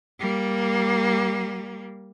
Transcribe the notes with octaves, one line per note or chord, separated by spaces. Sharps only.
G3 A#3